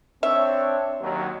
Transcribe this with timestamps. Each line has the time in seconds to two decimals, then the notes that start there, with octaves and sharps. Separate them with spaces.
0.23 C4 D4 C#5 E5
1.01 D#2 F#3